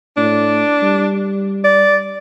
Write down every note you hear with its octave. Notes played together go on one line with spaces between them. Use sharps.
A2 D4
G3
D5